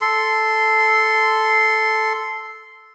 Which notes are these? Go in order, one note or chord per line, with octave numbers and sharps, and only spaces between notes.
A4 C6